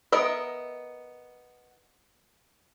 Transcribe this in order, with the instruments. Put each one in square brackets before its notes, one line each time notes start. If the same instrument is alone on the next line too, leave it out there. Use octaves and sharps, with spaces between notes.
[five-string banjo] B3 A#4 D#5 E5